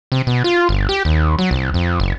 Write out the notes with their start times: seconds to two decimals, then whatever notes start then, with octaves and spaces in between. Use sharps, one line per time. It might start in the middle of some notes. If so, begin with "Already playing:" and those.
0.12 C3
0.27 B2
0.44 F4
0.69 G1
0.89 G4
1.05 D#2
1.39 F#3
1.51 C2
1.74 F2
2.00 F#1